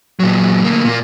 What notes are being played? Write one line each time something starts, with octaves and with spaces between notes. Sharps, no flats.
A#2 F#3
D2 A#3
A#2 A#3